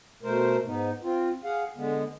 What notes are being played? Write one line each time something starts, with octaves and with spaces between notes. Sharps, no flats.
B2 A3 A#4 C5
G#2 B3 D#4
C4 F4
G#4 F5 F#5
D3 G#3 B3